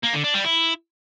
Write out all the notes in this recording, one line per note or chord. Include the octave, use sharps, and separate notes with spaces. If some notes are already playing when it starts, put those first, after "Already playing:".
A#3
D3
D4
G3
E4